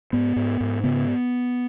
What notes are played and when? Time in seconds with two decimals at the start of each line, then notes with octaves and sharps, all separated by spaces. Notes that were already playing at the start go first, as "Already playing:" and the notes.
0.13 G#2 B3
0.36 G#2
0.60 G#2
0.84 C#3 B3